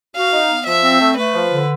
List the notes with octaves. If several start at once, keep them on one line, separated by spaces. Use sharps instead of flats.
F#4 F5
D#4
B3
F3 E5
C4
A3
A3 B4
F3
D3